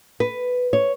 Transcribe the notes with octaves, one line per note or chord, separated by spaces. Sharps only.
B4
C#5